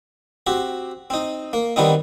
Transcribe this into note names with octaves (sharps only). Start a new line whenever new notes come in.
C4 F#4 G4
C4 D#4
A#3
D#3 G3 B3 C4 D#4